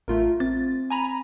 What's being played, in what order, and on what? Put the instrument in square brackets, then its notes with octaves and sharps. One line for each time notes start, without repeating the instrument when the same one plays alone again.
[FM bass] A1 [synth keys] A3 F4 A#4
[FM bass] C4 [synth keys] A6
[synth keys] G#5 A#5 B5